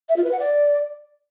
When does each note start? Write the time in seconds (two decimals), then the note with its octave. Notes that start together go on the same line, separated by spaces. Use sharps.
0.09 E5
0.16 F4
0.24 B4
0.32 F#5
0.39 D5